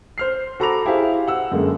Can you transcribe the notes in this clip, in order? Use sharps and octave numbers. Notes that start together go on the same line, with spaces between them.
C5 F6 C7
F#4 A4 A#5 B5 D6 F7
E4 G4 G#4 C5 F5
F#5 E6
F#2 D3 G#3 A#3